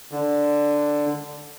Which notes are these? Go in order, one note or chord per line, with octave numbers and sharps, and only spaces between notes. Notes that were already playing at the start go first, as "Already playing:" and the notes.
D3